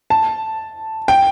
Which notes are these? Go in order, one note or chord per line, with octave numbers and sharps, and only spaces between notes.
A5
G5